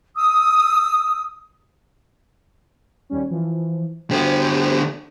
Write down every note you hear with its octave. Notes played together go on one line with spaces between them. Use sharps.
D#6 E6
D#2 G3 C#4
E3 F3
D3 A3 F#4 G4 C5